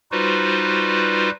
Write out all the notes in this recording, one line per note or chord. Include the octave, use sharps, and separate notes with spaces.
G3 D#4 F4 F#4 B4 C5